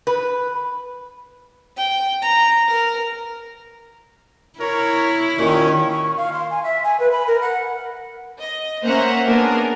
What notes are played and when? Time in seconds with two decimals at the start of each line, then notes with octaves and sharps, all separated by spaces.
0.07 B4
1.77 G5
2.22 A#5
2.68 A#4
4.59 E4 A#4 C#5
5.38 D#2 A#2 D#3 C#4
5.91 C#6
6.17 F5
6.33 C6
6.50 G#5
6.64 E5
6.84 G#5
7.00 B4
7.11 B5
7.27 A#4
7.42 F#5
8.38 D#5
8.85 A#3 C#4 C5 E5 F#5 A#5
9.27 A#3 B3 D4 G#4 A#4